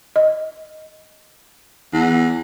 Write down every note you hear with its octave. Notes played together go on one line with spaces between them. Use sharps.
D#5
E2